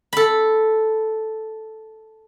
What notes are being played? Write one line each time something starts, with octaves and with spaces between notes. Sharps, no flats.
A4 B5